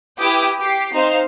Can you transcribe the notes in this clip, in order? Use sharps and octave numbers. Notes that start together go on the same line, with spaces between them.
E4 G4 B4 G5 D6 D#6
G4 C7
C4 D#4 C5 F5 C6